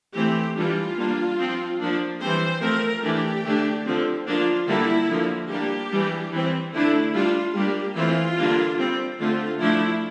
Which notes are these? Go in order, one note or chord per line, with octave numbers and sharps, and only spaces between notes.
E3 A3 C4 G4
E3 G3 D4 F4
G3 A#3 D4
F3 C4
F3 A#3 D4
E3 G3 C4 C5
F3 A3 C4 A#4
E3 A3 D4 G4
D3 A3 D4
D3 F3 C4
F3 A#3 D4 F4
D3 G3 A#3 D4 E4
D3 F3 A#3
G3 A#3 D4 G4
E3 G3 D4
E3 G3 C4
D3 A3 D4 E4
G3 D4 F4
G3 A#3 D4 G4
E3 A3 C4 F4
D3 G3 A#3 D4
G3 C4
D3 A3 C4 F4
F3 A3 D4 E4